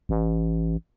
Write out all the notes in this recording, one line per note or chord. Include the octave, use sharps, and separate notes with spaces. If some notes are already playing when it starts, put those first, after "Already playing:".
A1